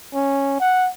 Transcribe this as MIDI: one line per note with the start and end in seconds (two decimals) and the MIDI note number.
0.14 0.60 61
0.60 0.90 78